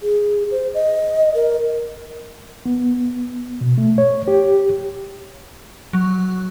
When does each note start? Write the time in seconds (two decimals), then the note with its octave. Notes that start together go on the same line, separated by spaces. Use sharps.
0.02 G#4
0.51 C5
0.74 D#5
1.35 A#4
2.66 B3
3.61 B2
3.78 A3
3.98 C#5
4.28 G4
5.93 F#3